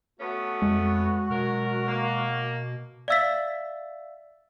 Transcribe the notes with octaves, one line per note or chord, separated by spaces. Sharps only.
A3 B3 C#4 F#4
F2 G#3
B2 F#3 A#4
A#3
D5 E5 F5 E6 A6 B6